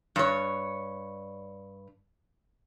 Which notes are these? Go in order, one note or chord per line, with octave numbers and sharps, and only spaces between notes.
G2 C#5